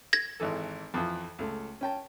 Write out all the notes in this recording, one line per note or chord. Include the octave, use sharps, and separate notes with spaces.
G#6 A#6
G#1 E3 A4
F2 E3 F3
C#2 A3
C#4 G5 A5